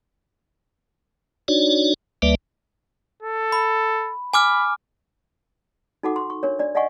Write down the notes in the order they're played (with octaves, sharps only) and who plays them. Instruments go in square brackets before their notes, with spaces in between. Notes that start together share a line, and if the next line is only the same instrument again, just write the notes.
[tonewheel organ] D4 D#4 F#4 C#5 D5
D2 G3 A#3 B4 D5 E5
[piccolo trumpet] A4
[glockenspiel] B5
[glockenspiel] G#5 D6 F6 [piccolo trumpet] B5
[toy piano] D#4 F#4 A4 F#5 D6
C6 C#6
C#6
D4 A#4 C#5
D4 D5
D5 D#5 F5 F#5 G#5 C#6